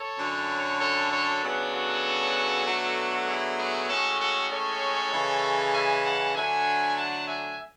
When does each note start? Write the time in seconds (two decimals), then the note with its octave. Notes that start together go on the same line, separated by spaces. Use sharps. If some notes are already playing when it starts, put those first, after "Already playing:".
Already playing: A4 C#5
0.19 F#2 D3 F#3
0.80 A4 C#5
1.11 A4 C#5
1.41 C#3 F#3 B3 D4
1.72 F#4 A4
2.65 B2 F#3 A3 D4
3.26 E4 G#4
3.57 E4 G#4
3.88 A2 G#3 C#4 F#4 A4
4.19 F#4 A4
4.50 A4 C#5
5.11 C#3 E3 G#3
5.73 E5 G#5
6.04 F#5 A5
6.34 D3 F#3 A3 D4 E5 G#5
6.97 F#5 A5
7.27 E5 G#5